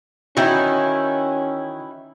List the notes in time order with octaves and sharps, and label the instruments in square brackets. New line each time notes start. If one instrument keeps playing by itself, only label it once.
[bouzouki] D#3 E3 [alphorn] C#4 [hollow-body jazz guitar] D#4 E4 F#4